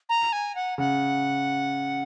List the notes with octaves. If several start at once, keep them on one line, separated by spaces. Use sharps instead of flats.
A#5
G#5
F#5
C#3 F#5